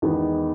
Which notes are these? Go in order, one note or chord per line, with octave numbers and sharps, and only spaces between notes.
E2 D#3 G#3 B3 D#4